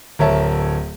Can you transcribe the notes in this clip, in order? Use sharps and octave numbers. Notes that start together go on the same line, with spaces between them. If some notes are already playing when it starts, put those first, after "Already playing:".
D1 A#4 C#5 E5 A5